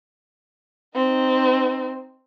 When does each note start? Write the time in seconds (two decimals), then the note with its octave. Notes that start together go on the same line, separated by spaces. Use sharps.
0.96 C4 D#4